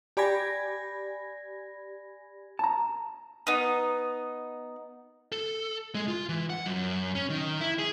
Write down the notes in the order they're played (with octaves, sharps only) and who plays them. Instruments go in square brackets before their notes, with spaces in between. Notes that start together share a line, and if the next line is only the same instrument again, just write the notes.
[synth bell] G4 D5 G#5 B5 G#6 A#6
[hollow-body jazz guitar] A5 A#5
[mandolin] B3 D#4
[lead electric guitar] A4
G#3
F4
E3
F#5
F#2
C#4
D#3
E4
G#4